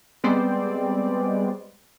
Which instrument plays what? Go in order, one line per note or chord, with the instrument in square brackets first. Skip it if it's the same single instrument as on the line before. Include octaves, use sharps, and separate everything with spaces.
[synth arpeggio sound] G3 G#3 B3 C4 C5 D5